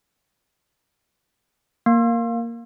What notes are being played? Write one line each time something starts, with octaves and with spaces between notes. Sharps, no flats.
A#3